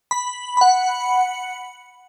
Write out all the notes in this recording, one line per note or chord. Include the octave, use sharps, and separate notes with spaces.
B5
F#5 B5